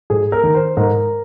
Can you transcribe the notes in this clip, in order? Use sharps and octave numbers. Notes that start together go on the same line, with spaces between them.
G#2 G#4
A#4
D#3
C5
G#2 A#4